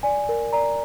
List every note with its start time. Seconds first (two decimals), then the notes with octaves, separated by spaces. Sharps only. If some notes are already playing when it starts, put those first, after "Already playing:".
0.03 D5 G#5
0.29 A#4
0.53 D5 A#5